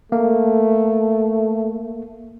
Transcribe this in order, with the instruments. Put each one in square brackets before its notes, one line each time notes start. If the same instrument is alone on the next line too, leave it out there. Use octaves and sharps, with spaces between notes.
[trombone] A3 [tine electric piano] A#3